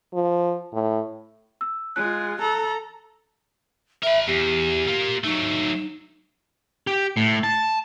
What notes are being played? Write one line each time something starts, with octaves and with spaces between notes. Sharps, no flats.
F3
A2
E6
G#3 F4 F#6
A4 A#5
A#4 E5 B5
E2 G4
A#3 F4
F#3 A3 D#4
G4
A2
A5